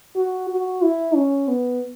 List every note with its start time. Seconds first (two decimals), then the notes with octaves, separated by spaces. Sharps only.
0.16 F#4
0.50 F#4
0.82 E4
1.16 C#4
1.48 B3